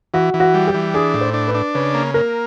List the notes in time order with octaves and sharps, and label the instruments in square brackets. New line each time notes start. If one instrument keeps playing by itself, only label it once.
[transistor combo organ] E3 [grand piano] F#4
[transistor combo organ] E3
[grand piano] F#4
[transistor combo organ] G3
[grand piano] G4
[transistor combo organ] E3
[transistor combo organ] D4 [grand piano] G#4
[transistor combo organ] A2
[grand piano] C5
[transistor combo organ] D4
[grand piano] B4
[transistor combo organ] D4
[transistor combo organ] C#3 [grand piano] B4
[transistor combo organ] A#3
[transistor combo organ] A#3 [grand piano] A#4